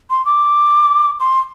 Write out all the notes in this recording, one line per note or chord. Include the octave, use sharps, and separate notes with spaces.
C6
D6
C6